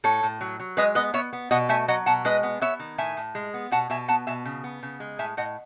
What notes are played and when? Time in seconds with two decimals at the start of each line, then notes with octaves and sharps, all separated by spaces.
0.04 A2 A4 C#5
0.23 A2
0.41 F#3
0.60 F#3
0.77 G#3 B4 D#5
0.95 B3 B4 D#5
1.14 B3 C#5 E5
1.33 B3
1.51 B2 D#5 F#5
1.69 A3 E5 G#5
1.88 F#3 D#5 F#5
2.06 B2 F#5 A5
2.25 G#3 B4 D#5
2.43 B3
2.61 B3 C#5 E5
2.80 D#3
2.98 A2 E5 G#5
3.17 A2
3.35 G#3
3.54 B3
3.72 B2 F#5 A5
3.90 B2 E5 G#5
4.08 B3 F#5 A5
4.27 B2 E5 G#5
4.45 C#3
4.64 B3
4.83 C#3
5.00 G#3
5.19 A2 E5 G#5
5.37 A2 D#5 F#5